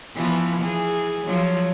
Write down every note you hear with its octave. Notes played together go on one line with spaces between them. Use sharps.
E3 F3 B3
E3 G#4
F3 F#3